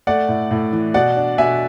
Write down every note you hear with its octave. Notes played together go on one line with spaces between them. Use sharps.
A3 D5 F#5
A2
A2
E3
B2 D5 F#5
D4
B2 E5 G#5